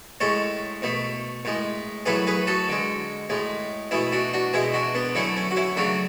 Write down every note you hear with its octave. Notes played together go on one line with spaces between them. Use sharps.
A2 G#3 A4 C#5
B2 A3
A2 G#3
A2 F#3 A3 G#4 B4
G#4 B4
F#4 A4
D3 G#3
A2 G#3
B2 A3 E4 G#4
D4 F#4
D4 F#4
B2 G#3 E4 G#4
D4 F#4
B3 D4
D3 F#3 A3 C#4 E4
C#4
F#4
C#4 E4
C#3 F#3 A3 D4 F#4